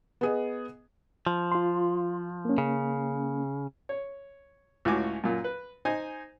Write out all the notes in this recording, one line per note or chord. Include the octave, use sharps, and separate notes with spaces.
B3 G#4 D#5
F3
F4 C6
A#3 C#4
C#3
C#5
C#2 A2 F4 F#4 G#5 D6
F#2 A#2
B4
D#4 C5 G#5